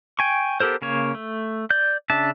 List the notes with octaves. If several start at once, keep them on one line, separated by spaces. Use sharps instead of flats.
G5 G#5 C#6
B3 G4 A4 A#4 C5
C#3 A#3 C#5
A3
D5 G6
C#3 D4 E5 A5